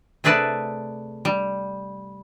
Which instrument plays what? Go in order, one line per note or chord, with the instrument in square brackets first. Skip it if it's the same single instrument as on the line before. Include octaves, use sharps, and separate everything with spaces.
[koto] C3 A3 G#4 B4 D5 A5
G3